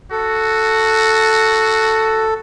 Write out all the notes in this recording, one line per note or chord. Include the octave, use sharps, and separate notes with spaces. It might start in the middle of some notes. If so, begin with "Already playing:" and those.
F#4 A4